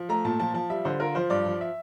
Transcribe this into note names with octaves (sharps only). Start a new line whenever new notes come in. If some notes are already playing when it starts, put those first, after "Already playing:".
Already playing: F3
A3 A#5
A#2 A5
F3 A5
F3 A5
G3 E5
D3 C5
F4 A#4
F3 C5
G2 D5
F3
E5